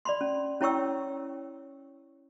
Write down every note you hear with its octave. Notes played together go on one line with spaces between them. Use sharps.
D5 B5 C6
C#4
C#4 E4 C#5 G5 C#6 E6